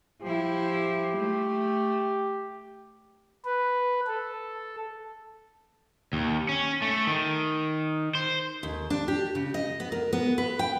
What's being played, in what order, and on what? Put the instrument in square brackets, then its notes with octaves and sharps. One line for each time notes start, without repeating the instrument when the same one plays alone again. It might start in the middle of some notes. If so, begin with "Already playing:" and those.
[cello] F3 E4 [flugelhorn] G4
[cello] A3
[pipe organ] B4
A4
[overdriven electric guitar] D#2
C#4
A3
D#3
C5
[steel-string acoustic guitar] D#2
D4
G4
C#3
D#5
B3
A#4
B3
B4
G5